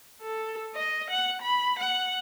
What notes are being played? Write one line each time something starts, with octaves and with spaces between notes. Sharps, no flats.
A4
D#5
F#5
B5
F#5